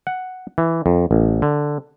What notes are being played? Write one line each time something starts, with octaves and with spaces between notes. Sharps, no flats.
F#5
E3
F2
A1
D3